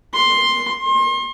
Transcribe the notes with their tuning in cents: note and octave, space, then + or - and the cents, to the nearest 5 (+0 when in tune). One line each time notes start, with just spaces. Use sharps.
C6 +10
C6 +35